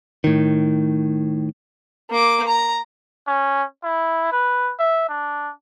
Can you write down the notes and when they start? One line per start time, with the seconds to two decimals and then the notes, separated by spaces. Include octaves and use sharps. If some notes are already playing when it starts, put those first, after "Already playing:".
0.24 A2 D#3
2.10 A#3 D6
2.47 A#5
3.27 C#4
3.83 E4
4.32 B4
4.79 E5
5.09 D4